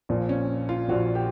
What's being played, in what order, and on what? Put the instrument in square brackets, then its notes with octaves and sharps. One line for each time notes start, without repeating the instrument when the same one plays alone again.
[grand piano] A#1 A#2 F3
C#4
F4
A#1 A#2 F3 F#4
G4